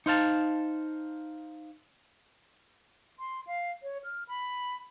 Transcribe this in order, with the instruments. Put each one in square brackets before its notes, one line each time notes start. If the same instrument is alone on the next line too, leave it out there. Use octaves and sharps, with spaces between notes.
[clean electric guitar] D#4 C5 F5 A5
[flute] C6
F5
C#5
F6
B5